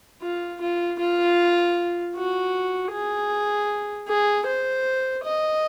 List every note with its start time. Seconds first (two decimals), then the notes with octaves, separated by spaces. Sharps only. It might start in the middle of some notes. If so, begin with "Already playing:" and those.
0.21 F4
0.61 F4
0.99 F4
2.15 F#4
2.92 G#4
4.08 G#4
4.46 C5
5.24 D#5